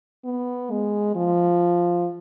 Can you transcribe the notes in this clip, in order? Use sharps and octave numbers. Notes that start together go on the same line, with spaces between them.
B3
G#3
F3